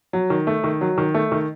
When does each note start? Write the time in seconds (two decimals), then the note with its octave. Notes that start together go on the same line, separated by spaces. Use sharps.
0.13 F#3
0.30 D#3
0.47 A3
0.64 D#3
0.81 F#3
0.98 D#3
1.14 A3
1.32 D#3